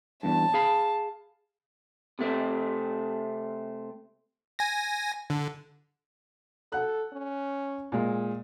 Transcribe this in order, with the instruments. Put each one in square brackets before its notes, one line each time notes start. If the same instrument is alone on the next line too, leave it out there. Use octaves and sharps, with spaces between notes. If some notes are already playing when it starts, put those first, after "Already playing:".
[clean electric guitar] E2 G2 [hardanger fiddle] A5
[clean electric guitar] G#4 F5 B5
C3 A3 C4
[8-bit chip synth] G#5 A#6
D3
[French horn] A4 [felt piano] F#5 F#6
[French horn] C#4
[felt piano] A#2 G#3